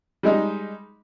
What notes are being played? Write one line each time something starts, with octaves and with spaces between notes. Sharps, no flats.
G3 G#3 D#4